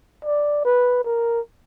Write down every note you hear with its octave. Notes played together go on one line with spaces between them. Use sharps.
D5
B4
A#4